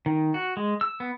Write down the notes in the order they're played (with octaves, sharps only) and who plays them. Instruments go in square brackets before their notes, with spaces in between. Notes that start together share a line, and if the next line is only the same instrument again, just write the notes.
[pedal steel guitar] D#3
F#4
G#3
E6
B3